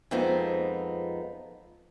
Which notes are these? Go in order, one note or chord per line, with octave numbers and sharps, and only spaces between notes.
F2 G#3 B3 C4 D#4 F4